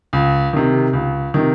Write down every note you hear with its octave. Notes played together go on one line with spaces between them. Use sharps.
C#2
C3 D#3
C#2
C3 D#3